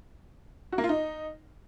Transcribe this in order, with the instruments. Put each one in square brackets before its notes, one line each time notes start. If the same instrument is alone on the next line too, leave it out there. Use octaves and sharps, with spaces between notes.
[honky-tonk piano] F#4
A#3
F4
D#4